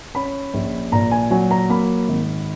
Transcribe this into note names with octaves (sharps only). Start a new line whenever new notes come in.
C#4 B5
A#1
A#2 A#5
G#5
F#3 G#5
A#5
A#3 B5
G#1